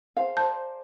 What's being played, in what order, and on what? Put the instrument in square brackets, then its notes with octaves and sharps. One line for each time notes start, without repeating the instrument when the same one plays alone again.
[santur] G#4 C5 A5 [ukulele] F5
[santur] A#4 C5 D5 [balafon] A5 [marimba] G6